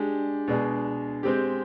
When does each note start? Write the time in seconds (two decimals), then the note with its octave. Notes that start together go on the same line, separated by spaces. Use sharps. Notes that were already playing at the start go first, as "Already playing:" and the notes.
Already playing: G#3 D4 G4
0.48 B2 G#3 D4 G#4
1.23 G#3 C4 G4